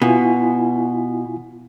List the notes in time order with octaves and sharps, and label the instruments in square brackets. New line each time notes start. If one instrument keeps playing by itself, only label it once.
[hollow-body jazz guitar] B2 [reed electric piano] E4 F4 G#5